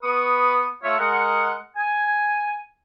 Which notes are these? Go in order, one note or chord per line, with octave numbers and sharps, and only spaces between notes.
B3 B4 C#6 D#6
A3 F4 C#5 E5
G#3 A#4 F#5
G#5